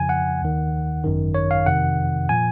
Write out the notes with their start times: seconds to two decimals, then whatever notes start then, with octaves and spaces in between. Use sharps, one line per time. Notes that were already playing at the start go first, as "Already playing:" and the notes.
Already playing: F2 C#3 F3 G#5
0.09 F#5
0.41 D#2 D#3
1.04 G#1 F#2 D#3
1.34 C#5
1.51 F5
1.66 F2 C3 D#3 F#5
2.29 A#2 F3 G#5